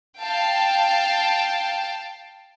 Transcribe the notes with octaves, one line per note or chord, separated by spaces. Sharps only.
F5 G5 A5